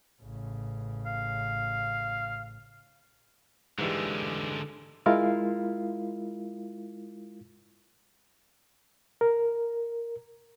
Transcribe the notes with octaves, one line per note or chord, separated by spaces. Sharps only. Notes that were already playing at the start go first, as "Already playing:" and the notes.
A1 C#3
F5
G#2 D3 E3 G3 G#3
G#3 E4 F4 A#4 F5
A#4